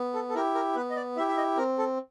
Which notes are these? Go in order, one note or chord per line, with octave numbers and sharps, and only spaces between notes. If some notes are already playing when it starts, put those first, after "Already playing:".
Already playing: B3
A4
A4
E4 G4 A#4
A#4
B3 B4
D#5
D5
E4 G4 E5
E5
D#5
C4 A#4
A4